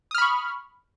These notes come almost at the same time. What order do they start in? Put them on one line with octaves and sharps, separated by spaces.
D#6 F6 B5 C#6